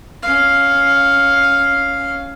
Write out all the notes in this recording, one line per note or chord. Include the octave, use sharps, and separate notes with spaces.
C#4 F5